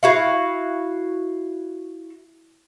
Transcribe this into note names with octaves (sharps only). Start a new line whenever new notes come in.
E4 F#4 F5